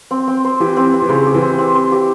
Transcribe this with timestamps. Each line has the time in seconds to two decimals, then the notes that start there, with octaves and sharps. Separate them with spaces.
0.11 C4
0.28 C4
0.44 C5
0.60 E3 G4
0.77 C4
0.94 C4
1.02 E3
1.09 C#3 C5
1.27 G4
1.34 E3
1.42 C4
1.58 C4
1.74 C5
1.92 G4